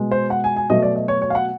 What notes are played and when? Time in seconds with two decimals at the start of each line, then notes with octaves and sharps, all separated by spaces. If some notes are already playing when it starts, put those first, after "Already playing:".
Already playing: B2 G#3
0.11 C5
0.30 F#5
0.44 G#5
0.57 G#5
0.70 B2 F#3 A3 D#5
0.82 D5
0.96 D#5
1.08 C#5
1.22 C#5
1.30 F5
1.35 F#5